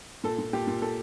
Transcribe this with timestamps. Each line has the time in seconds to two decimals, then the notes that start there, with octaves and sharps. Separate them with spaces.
0.24 A#2 A4
0.38 A#2
0.53 A#2 G4
0.67 A#2
0.82 A#2 A4